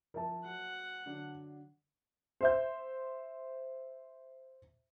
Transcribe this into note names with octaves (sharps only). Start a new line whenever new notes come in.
F3 A#4 E5 A5
F#3 F#5
D3 F#3 D4
C5 E5 G6